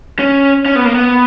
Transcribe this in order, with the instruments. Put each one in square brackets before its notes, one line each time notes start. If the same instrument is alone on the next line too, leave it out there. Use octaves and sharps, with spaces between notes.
[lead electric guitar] C#4
C#4
B3
A#3
B3